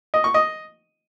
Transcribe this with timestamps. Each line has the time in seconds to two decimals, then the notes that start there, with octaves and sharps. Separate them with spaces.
0.14 D#5
0.24 C#6
0.34 D#5